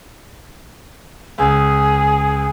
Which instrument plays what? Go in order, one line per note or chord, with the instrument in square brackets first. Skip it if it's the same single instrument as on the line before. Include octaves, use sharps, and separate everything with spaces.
[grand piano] C#2 [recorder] G#4